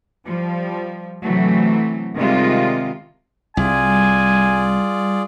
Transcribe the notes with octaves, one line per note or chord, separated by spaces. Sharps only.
F3 G3
C3 E3 F#3 A3
C3 D#3 G3 G#3 F4
C2 G3 F4 G#4 D5 G#5